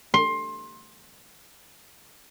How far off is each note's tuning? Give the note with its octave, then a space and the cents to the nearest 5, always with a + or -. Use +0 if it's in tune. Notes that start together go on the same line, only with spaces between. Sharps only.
C6 +20